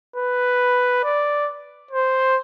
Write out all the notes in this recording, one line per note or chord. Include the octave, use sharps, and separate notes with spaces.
B4
D5
C5